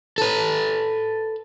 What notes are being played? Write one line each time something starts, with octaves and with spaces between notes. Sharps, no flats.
A4 B4